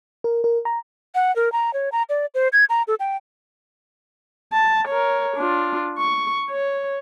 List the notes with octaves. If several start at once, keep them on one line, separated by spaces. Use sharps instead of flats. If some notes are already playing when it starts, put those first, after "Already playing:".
A#4
A#4
A#5
F#5
A#4
A#5
C#5
A#5
D5
C5
G#6
A#5
A4
G5
A5
A#4 C#5
D4 F4
C#6
C#5